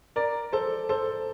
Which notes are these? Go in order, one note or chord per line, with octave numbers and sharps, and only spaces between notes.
A#4 D5
A4 C5
A4 C5